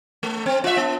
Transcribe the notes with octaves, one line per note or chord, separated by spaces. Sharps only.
A3
C4
F4 E5
B3